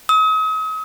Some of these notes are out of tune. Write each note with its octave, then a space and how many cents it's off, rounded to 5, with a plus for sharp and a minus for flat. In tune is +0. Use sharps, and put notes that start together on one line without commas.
D#6 +40